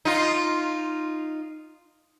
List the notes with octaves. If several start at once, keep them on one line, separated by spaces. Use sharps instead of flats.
D#4 F4